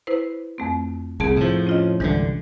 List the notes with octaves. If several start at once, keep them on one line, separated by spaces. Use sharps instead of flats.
E4 B4 C5
F2 A3 C4
C2 C4 G#4 A5
A2 F3
C#4 F4 D#5
C2 G2 D3 E3 G#3